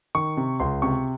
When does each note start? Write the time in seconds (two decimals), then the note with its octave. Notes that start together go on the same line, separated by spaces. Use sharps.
0.15 D#3 C#6
0.37 C3
0.60 C#2 C6
0.82 C3 C#6